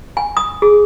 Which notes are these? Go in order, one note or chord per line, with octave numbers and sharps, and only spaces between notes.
G#5
D#6
G#4